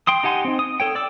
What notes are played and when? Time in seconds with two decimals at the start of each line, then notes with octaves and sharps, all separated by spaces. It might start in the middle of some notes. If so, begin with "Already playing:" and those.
0.07 G5 C6 D#6
0.23 D#4 G4 F#5 G#5 C6
0.45 C4 D#4
0.59 D#6
0.80 A4 C#5 G5
0.95 D5 D6 E6